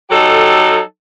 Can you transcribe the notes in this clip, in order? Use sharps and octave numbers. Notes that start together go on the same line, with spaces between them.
F#3 D#4 G4 A4